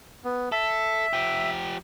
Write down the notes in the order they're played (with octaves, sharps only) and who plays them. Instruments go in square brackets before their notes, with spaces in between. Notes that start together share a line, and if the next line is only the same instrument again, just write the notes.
[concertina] B3
[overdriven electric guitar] A4 [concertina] E5
[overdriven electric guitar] F3 G4